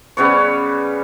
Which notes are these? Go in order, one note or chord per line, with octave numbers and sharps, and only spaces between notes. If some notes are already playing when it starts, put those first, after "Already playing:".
C#3 G3 B3 C#5